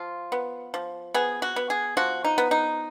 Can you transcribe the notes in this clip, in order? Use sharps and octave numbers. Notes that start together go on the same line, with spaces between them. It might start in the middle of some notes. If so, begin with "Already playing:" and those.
Already playing: F3 F4
B3
F3
B3 G#4
F#4
B3
G#4
F3 F#4
D#4
B3
D#4